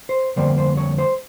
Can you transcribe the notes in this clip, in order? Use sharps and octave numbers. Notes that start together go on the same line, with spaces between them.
C5
F2 D3 G3 A#3 C5
C5
C#5
C5